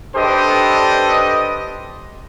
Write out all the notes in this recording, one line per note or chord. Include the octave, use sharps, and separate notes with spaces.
D4 G4 A4 B4 C5 D#5